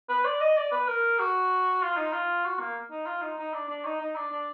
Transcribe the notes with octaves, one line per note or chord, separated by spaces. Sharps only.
B4
D5
D#5
D5
B4
A#4
F#4
F4
D#4
F4
F#4
A#3
D#4
F4
D#4
D#4
D4
D4
D#4
D#4
D4
D4